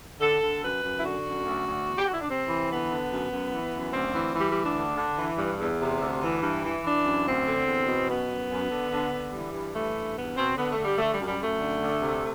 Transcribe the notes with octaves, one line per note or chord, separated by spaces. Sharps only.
D3 A4
D3
F#2 B4
F#2
E4
D3 F#4
F#2
D2
D2
E2
G4
D3 F#4
E4
D4
C3 C4
E3
D3 B3
D3
F#2
F#2
E3
F#2
D2 C4
E3
E3 G3
G3
D2
D4
D3
D3
E3
G2
E2
C3
D2
E3
G2
E3
E3 D4
F#2
D2 C4
D3
E2
B2
F#2 B3
F#2
F#2
D3
D3
D3
E3 G3
G2
E3 A3
G2
E2 B3
B2 C4
D3 B3
A3
D3
G3
D3 A3
G3
F#2
G3
F#2 A3
D3
D2
C3